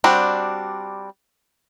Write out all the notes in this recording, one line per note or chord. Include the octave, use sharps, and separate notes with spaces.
G3 C4 D4 F#4